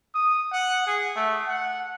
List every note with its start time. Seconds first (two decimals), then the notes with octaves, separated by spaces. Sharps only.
0.14 D#6
0.53 F#5
0.87 G#4
1.16 A3
1.48 F#5